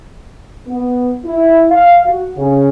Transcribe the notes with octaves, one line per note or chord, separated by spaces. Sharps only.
B3
E4
F5
F#4
C#3